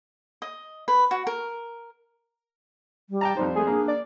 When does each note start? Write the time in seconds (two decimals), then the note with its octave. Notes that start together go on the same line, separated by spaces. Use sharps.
0.42 D#5
0.88 B4
1.11 F#4
1.27 A#4
3.10 G3
3.21 G5 A5 A#5
3.37 F2 G3 D#4 C5
3.55 A3 G#4
3.67 A#3 D4
3.88 D5